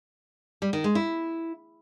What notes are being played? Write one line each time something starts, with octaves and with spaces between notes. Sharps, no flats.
G3
D#3
G#3
E4